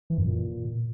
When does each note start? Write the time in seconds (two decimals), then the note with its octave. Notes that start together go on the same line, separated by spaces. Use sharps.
0.10 E3
0.18 F#2
0.26 A#2